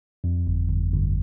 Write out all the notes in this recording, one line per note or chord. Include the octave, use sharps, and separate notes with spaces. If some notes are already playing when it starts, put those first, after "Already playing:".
F2
G1
G1
G1